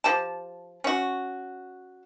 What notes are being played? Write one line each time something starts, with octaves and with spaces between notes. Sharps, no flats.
F3 G4 A5
C#4 F#4